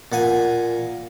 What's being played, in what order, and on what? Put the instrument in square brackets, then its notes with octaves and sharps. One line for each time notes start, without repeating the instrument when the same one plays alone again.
[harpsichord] A#2 F#5 G#5